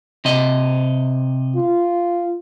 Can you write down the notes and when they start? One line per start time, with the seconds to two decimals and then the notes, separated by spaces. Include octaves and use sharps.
0.25 C3 D#5
1.56 F4